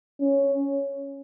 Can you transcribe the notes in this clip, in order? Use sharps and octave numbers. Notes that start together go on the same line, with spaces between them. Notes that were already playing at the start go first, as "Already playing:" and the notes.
C#4